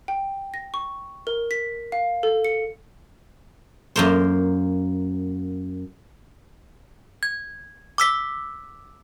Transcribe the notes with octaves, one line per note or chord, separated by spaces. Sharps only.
G5
A#6
C#6
A#4
B6
F5
A4
C#7
F#2 A#3 C5
G#6
D6 E6 B6